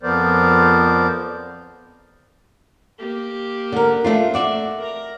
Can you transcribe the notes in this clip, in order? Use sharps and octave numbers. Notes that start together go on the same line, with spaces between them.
F2 F3 B3 A#4 C5 D5
A#3 G4
D3 A#4
A3 D4 F4
F#4 D5 E5
A#4 A#5